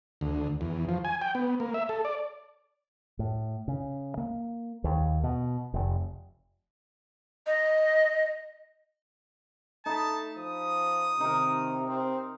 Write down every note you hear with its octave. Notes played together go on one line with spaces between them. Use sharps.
D2
E2
F3
G#5
G5
B3
A#3
E5
A4
D5
A2
C#3
A#3
D#2
B2
F1
D#5
A3 D#4 A5 B5
F3 D#6
C3 D#3 D#4 A#4
C4